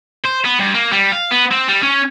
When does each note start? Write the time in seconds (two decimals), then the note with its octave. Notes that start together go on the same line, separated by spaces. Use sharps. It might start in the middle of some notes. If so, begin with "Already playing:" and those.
0.24 C5
0.45 B3
0.59 G2
0.74 A#3
0.92 G3
1.12 F5
1.31 B3
1.52 C4
1.69 G3
1.82 C#4